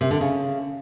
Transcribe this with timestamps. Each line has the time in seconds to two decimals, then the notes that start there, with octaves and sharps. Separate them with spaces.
0.01 C3
0.11 D3
0.21 C#3